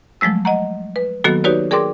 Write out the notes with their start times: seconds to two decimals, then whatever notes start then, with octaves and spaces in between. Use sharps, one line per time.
0.21 F3 F#3 G#3 A3 E6
0.45 D#5 F#5 A#5
0.96 B4
1.24 D#3 F#3 A#3 B3 F#4 A4
1.44 D#4 F#4 G4 B4 C#5 D5
1.71 G#4 A#4 D5 G5 C6 D6